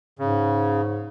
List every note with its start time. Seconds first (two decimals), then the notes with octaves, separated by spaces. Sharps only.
0.19 G#2 C#3